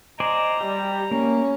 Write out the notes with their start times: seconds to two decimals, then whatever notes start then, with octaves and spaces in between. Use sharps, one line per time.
0.20 C5 D5 D#5 G#5 A#5
0.61 G3 G4
1.11 A#3 C#4